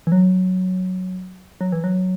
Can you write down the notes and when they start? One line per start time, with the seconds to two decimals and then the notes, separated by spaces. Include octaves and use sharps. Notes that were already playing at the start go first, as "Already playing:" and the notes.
0.07 E3
0.12 F#3
1.61 F#3
1.72 E3
1.84 F#3